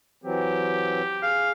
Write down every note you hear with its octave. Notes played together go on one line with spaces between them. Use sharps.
E3 F#3 C4 G4
G#4 F5